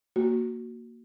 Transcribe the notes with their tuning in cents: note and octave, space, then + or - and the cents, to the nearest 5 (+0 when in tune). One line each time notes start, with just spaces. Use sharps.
A#3 +0 F#4 +0